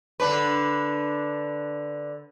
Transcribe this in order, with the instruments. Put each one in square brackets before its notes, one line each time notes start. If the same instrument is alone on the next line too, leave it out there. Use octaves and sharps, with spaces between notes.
[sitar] D3 D4 B4